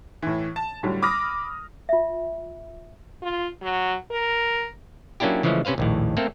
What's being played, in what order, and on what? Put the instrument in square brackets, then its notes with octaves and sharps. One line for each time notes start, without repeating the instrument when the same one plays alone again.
[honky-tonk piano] A2 E3
A5
A2 D3 F#3 G3
B5 D6 D#6 F6 A#6
[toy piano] F4 E5
[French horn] F4
F#3
A#4
[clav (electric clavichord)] F#3 A#3 C#4 D4 E4 G4
C#3 E3 F3 G#3 A3 C#4
C3 C#4 B4 C5 F5
A#1 D#2 A2
A3 A#3 C4 A4 A#4